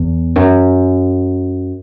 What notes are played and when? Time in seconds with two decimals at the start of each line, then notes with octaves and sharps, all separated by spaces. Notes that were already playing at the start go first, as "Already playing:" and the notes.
Already playing: E2
0.36 F#2